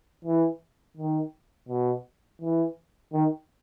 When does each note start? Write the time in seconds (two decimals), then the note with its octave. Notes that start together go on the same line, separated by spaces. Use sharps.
0.24 E3
0.97 D#3
1.69 B2
2.41 E3
3.13 D#3